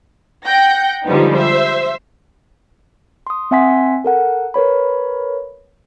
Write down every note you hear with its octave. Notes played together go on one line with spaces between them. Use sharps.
F#5 G5 G6 A#6
D3 F3 G3 G#3 B3 D#4
C5 E5
C6 D#6
C4 E5 F#5 G#5 C6 B6
A4 A#4 F#5
A#4 B4 C#5 B5